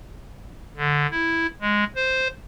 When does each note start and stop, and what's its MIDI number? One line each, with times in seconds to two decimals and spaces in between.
0.77 1.06 50
1.11 1.47 64
1.61 1.84 56
1.95 2.28 72